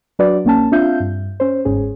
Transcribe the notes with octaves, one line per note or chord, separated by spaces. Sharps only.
F#3 D4 F#4 B4 D5
A#1 A#3 C#4 A5
C4 D4 F4 E5 F5 G6
G2
C#4 C5
G1 G#2 C#4 G#4